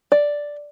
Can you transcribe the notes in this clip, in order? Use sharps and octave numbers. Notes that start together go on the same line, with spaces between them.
D5